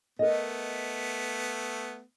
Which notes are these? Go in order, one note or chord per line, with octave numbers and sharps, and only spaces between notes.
A3 B3 A#4 D#5